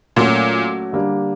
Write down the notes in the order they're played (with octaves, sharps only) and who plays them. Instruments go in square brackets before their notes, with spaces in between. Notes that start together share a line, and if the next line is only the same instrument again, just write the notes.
[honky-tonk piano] A#2 [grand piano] F#3 A3 C#4 F#4
[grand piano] D3 G3 A#3 D4